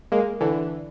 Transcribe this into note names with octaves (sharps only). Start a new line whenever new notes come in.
G#3 A#3
D3 E3